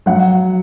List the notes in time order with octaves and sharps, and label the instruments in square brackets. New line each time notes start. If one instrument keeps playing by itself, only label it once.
[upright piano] F#3 F#5